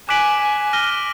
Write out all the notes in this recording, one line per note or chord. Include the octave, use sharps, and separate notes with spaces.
G#5 D6 F#6 B6 D7 F#7
G#5
F6 A#6 D#7 G7